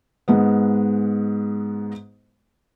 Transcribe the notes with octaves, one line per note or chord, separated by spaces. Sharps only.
G#2 G#3 B3